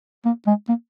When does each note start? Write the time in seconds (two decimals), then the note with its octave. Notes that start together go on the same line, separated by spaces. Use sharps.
0.25 A#3
0.47 G#3
0.69 A#3